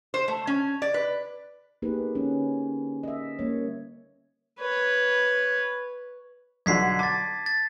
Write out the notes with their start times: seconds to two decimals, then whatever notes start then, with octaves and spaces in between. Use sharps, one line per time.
0.14 C5
0.28 A3
0.47 C#4
0.82 D5
0.94 B4
1.82 A#3 B3 D#4 G4 G#4 B4
2.15 D3 C#4
3.03 D#5 E5
3.39 G3 A#3 C#4 C#5
4.60 B4 C#5
6.66 B1 D3 F#4 G#6 B6 C7
6.99 A5 D6 A6
7.46 A6